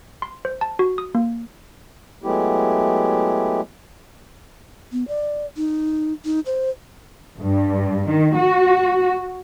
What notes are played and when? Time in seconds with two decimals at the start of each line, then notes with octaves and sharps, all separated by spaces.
0.22 C6
0.45 C5
0.61 A5
0.79 F#4
0.98 D#6
1.15 A#3
2.24 F#3 G#3 A3 B3 E4 G4
4.92 B3
5.08 D5
5.57 D#4
6.25 D#4
6.46 C5
7.39 G2
8.08 D#3
8.36 F#4